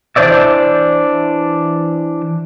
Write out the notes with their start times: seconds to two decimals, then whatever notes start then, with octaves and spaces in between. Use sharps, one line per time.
0.16 E3 D4 C5 D5 E5